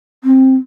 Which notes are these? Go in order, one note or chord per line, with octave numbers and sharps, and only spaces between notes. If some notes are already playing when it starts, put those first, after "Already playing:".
C4